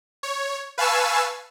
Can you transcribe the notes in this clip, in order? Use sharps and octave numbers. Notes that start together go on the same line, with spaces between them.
C#5
B4 F5 G#5 A5 C#6 E6